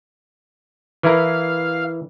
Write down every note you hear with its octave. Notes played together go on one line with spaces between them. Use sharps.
E3 E4 A#4 F5